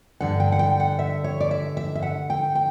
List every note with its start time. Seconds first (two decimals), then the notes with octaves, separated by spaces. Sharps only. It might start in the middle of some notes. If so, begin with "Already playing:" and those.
0.21 G2 D3 G3 F#5
0.40 G5
0.52 F#5
0.59 G5
0.80 F#5
0.99 E5
1.24 C#5
1.41 D5
1.51 E5
1.77 E5
1.95 E5
2.02 F#5
2.30 G5
2.55 G5